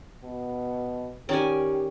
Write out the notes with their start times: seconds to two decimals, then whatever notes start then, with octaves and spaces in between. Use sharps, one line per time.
0.24 B2
1.29 D#3 C#4 G4 D5 G#5